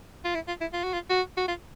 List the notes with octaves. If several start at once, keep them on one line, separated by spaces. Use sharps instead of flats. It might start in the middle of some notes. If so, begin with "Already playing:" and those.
F4
E4
F4
E4
F4
F#4
F4
F#4
F#4
F4